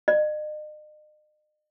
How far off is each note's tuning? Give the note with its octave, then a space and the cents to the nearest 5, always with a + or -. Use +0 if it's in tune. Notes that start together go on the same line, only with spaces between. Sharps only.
D#5 -40